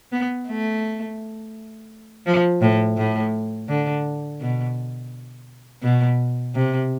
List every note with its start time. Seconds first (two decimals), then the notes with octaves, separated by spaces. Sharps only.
0.12 B3
0.48 A3
2.27 F3
2.62 A2
2.98 A2
3.69 D3
4.41 B2
5.83 B2
6.55 C3